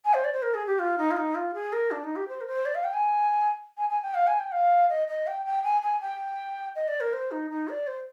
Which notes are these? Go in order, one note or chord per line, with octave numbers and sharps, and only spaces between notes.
G#5
C5
D5
C5
A#4
G#4
G4
F4
D#4
F4
D#4
F4
G#4
A#4
D4
D#4
G4
C5
A#4
C5
D5
F5
G5
G#5
G#5
G#5
G5
F5
G#5
G5
F5
D#5
D#5
G5
G5
G#5
G#5
G5
D#5
D5
A#4
C5
D#4
D#4
D5
C5